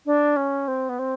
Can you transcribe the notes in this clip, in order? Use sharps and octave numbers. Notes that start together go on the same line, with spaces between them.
D4
C#4
C4
B3
C4